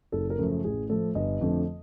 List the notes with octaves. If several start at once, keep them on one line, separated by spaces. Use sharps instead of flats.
F#1 A4
A#4
F#2 C#3 F3 A3
A1 G#4
A2 F3 A4
G1 D#5
F2 D3 F3 A3